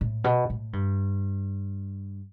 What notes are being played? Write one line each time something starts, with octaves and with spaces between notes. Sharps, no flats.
A2
B2
A2
G2